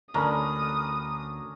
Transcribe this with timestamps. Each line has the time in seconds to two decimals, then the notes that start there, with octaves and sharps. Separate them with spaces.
0.14 D2 C#4 D4 A#4 A#5 B5 D#6